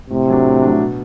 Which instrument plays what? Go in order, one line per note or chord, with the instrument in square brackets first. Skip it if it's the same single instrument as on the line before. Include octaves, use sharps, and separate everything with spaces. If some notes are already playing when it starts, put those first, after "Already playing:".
[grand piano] A2 [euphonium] C3
[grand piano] F#3 A3 D4
A2
F#3 A3 D4
B2